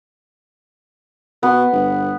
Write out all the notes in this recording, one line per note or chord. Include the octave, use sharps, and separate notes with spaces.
B2 B3
G1